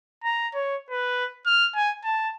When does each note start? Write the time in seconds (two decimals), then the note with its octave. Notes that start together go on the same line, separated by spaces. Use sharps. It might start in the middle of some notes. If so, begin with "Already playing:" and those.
0.24 A#5
0.55 C#5
0.90 B4
1.46 F6
1.75 G#5
2.04 A5